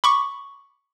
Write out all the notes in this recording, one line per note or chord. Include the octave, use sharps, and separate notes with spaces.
B5 C#6 D6